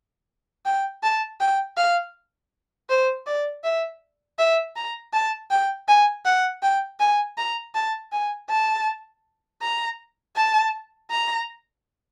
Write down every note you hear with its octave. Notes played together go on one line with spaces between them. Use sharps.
G5
A5
G5
F5
C5
D5
E5
E5
A#5
A5
G5
G#5
F#5
G5
G#5
A#5
A5
G#5
A5
A#5
A5
A#5